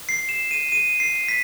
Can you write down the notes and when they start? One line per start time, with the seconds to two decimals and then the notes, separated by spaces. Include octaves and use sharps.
0.09 C7
0.29 E7
0.51 D#7
0.72 D#7
1.00 C7
1.28 B6